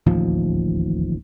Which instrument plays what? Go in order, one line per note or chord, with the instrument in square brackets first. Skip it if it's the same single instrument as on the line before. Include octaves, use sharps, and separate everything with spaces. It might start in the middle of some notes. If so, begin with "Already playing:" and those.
[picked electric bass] D1 A1 D#2 F3